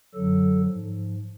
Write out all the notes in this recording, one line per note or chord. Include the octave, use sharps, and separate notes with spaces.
F#2 D3 F#3 A4
G#2 F3